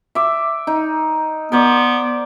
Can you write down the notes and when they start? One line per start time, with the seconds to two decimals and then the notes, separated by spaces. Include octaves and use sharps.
0.15 E5 D6
0.67 D#4
1.52 B3 A#4 C5 D5